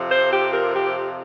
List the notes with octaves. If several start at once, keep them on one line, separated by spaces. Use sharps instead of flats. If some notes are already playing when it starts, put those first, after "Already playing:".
Already playing: F2 C3 F3
C5
G4
A#4
G4